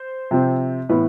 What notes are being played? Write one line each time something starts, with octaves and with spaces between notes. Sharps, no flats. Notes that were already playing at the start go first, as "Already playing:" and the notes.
Already playing: C5
C3 F3 C4
A2 E3 B3 B4